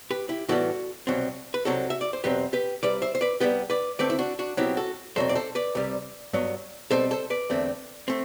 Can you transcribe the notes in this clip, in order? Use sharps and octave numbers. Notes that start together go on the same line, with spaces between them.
G4 B4
E4 G4
A2 E3 G3 B3 F#4 A4
C2 B2 F#3 C4
B4
C2 C3 F#3 C4 F#4 A4
E5
D5
C5
E2 B2 F#3 C4 G4 B4
G4 B4
C2 C3 G3 B4 D5
C5 E5
C5
B4 D5
C2 B2 G3 B3 G4 B4
B4 D5
D2 D3 A3 C4 B4 D5
E4
D4 F#4
D4 F#4
B2 F#3 C4 E4 G4
F#4 A4
E2 B2 F#3 C4 A4 C5
D5
A4 C5
B4 D5
C2 C3 G3
G2 F#3 B3
B2 G3 C4 A4 C5
A4 C5
B4 D5
E2 D3 A3 C4
A3 C4